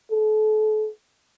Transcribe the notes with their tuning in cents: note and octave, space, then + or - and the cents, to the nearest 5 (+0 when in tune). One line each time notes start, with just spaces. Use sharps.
A4 -35